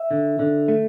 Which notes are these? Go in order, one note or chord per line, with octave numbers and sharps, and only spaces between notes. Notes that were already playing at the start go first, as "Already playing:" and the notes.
Already playing: E5
D3
D3
A3